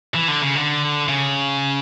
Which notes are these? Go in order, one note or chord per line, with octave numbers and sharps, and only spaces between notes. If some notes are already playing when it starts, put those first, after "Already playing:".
E3
D3
C#3
D3
C#3